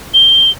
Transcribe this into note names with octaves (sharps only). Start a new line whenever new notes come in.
G7